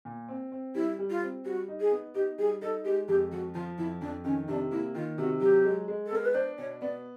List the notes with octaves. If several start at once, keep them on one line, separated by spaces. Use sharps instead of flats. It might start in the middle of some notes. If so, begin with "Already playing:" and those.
A#2
C4
C4
G3 E4
G3
F4
C4
G3 F#4
D#4
G#4
B3
D#4 G4
G3 G#4
D#4 A4
G#3 G4
F2 G4
F3 F#4
F3 F4
F2 E4
F2 D4
D#3 C#4
C3 D4
A#3 E4
D#3 F4
C3 F#4
F#3 G4
G#3
G#3
A4
B3 A#4
B4
D4 C5
B2 C#5
B3 D5